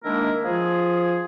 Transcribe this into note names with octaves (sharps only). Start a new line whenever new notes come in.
D#3 G#3 A#3 D4 E4 A#4
F3 F4 G#4